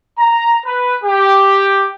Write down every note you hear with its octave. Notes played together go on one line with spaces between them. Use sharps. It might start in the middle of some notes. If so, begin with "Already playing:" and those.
A#5
B4
G4